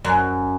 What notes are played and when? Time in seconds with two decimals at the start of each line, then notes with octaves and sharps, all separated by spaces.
0.05 F#2